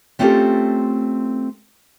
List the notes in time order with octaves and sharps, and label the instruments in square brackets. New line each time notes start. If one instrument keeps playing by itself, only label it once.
[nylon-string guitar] A3 C4 C#4 F4 G4 A4